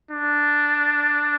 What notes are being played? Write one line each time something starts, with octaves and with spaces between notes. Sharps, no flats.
D4